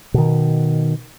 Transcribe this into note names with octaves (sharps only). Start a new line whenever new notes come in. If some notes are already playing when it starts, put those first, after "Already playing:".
B2 D#3